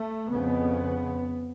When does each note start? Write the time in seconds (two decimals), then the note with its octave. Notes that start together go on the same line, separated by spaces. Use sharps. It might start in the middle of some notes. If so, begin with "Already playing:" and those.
Already playing: A3
0.28 F2 C#3 B3